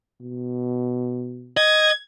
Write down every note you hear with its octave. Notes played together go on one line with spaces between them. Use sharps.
B2
D#5 G#6